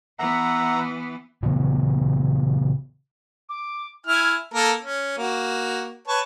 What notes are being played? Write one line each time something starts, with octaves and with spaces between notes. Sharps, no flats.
E3 B3 E5 F#5 A#5
A#2 C#3 E3 B3
D6
E4 G#5 F6
A#3 A4 A#4
C#4
A#3 F#4
B4 C#5 A5